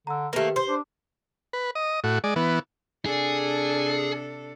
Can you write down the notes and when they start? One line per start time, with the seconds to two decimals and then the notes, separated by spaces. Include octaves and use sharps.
0.07 D3 A#5 E6
0.33 D#3 A3 A#3 G4 B4
0.56 C5
0.67 D4
1.53 B4
1.75 D#5
2.04 A2 F#4
2.24 G#3 D5
2.36 E3 B3
3.06 C3 D4 G#4 A4